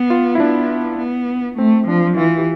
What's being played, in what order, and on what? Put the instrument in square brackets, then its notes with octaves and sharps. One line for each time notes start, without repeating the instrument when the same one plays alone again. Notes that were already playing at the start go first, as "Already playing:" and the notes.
Already playing: [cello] B3
[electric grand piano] F4
E4
[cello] B3 [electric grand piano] D4
[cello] B3
[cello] A3 [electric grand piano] C4
[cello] F3 [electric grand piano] D4
[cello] E3 [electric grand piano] F4
[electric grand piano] G4